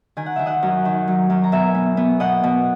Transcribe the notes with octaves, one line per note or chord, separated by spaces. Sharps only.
D#3 G#5
F#5
D#3 E5
D#5 F#5
F#2
D#3
F#3
F#2
A#5
B2 E5 G#5
B3
B3
B2 D#5 F#5
B2